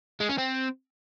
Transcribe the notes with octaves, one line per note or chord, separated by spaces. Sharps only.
G#3
C#4
C4